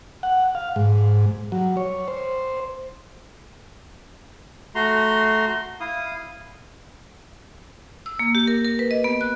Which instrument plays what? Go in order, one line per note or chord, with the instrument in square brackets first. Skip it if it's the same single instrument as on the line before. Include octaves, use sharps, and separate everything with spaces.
[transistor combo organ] F#5
F5
G#2
F#3
C#5
C5
[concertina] A3 F#4 A#5 C6
E4 F5 D#6
[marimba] E6
A#3
G4
A#4
A#4
B4
D#5
B3
F#6